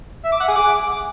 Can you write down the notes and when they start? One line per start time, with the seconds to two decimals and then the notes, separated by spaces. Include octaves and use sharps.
0.25 E5
0.33 D6
0.40 F#5
0.48 G#4
0.56 D6